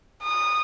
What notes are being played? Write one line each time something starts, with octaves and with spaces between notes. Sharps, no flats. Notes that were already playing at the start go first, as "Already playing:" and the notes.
D#6